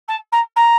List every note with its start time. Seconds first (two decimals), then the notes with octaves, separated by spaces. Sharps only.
0.08 A5
0.32 A#5
0.56 A#5